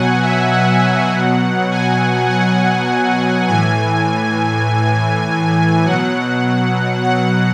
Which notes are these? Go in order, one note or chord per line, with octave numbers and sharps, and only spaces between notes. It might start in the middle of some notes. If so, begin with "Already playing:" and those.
Already playing: B2 F#3 F#5 G#5
E5
F#5
B2 F#3
G#5
F#5
A2 E3 G#5
B2 F#3 F#5
F#5